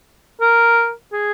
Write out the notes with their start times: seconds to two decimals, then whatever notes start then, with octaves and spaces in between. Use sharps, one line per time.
0.41 A#4
1.13 G#4